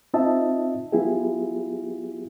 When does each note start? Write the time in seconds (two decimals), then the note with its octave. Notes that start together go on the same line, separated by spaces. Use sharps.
0.14 C4 D#4 F4 D#5 E5 A5
0.92 F#3 B3 E4 F4 G4 G#4